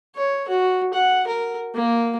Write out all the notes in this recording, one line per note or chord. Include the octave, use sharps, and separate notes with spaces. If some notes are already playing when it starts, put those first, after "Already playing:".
C#5
F#4
F#5
A#4
A#3